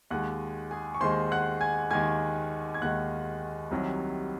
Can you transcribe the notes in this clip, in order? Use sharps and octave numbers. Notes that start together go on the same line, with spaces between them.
D#2 D#3 G#3 F#5 F#6
G#4 G#5
C#6
D#2 D#3 G#3 C5 C6
F#5 F#6
G#5 G#6
D#2 D#3 G#3 G#5 G#6
G#6
D#2 D#3 G#3 F#5 F#6
C2 C3 D#3 F#3